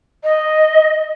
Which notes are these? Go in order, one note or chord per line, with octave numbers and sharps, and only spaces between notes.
D#5